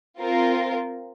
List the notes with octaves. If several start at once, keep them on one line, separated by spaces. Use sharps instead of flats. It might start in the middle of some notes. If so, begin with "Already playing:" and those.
C4 F4 A#4